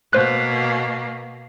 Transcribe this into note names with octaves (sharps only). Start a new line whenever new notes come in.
B2 A#3 C5 F#6